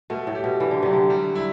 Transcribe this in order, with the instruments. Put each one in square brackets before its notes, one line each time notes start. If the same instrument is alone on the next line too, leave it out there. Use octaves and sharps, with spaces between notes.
[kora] B2 [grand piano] A3
[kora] A2
[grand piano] G4
[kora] B2
[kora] E3 [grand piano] D4
[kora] D3
[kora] C3 [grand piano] F#3
[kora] D3
[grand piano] G3
E4